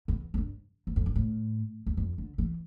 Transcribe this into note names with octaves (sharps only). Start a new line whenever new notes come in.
E2
F2
G2
E2
F2
G2
A2
E2
F2
D3
E3